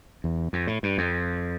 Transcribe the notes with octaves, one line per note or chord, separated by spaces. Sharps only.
E2
F2
A2
G2
F2